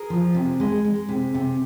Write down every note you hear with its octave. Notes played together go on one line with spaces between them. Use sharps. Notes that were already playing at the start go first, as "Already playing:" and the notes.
Already playing: G#4 A#4
F3
C3
G#3
G#3
C3
C3